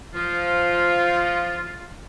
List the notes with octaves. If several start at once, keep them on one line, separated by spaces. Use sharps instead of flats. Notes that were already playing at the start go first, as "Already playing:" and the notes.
F3 F4